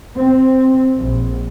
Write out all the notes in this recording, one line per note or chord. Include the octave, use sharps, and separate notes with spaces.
C4
A#1